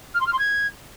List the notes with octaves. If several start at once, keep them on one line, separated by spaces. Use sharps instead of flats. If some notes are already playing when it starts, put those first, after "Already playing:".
F6
C6
F6
C6
G#6